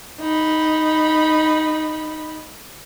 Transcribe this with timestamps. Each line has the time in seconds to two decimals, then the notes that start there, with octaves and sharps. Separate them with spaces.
0.21 D#4 B5